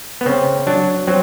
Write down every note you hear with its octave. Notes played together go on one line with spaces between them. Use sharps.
B3
C#3 C4
F#3 D4
F#3 C4